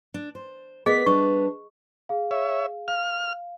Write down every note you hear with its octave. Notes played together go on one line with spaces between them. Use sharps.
D4
C5
B3 G#4 A#4 D5 D#5 B6
G3 D4 B4 C#6
G#4 F5
C#5 E5
F5 F6